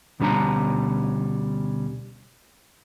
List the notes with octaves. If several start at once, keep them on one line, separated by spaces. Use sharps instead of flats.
D2 B2 G3 C#4 D4 A#5